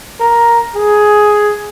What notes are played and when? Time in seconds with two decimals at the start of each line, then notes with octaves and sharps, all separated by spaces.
0.20 A#4
0.76 G#4